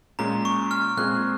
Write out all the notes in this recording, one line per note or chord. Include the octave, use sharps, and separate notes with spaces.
A#2 G#3 C#4 A#5
C#6
F6
A#2 G#3 C4 F4 G#4 F#6